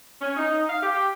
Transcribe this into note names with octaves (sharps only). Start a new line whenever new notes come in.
C#4
D#4
F5
G4